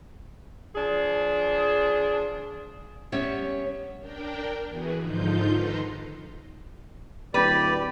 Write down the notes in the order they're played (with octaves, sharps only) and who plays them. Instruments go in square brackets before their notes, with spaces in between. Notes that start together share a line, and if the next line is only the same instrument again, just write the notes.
[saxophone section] F3 D4 G#4
[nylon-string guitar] G3 B3 C#4 C#5 E5
[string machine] D4 A#4 G5
E3 B3 F#4 G#4
G#2 D3 F3 D#4 F4 G6
D#3 A4 B4 A#5 C6
[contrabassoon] D1 [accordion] G4 D5 [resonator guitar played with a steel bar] B4